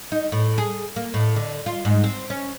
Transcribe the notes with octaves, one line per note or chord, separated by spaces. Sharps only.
D#4
A2
G#4
A#3
A2
D3
F4
G#2
C4
C#4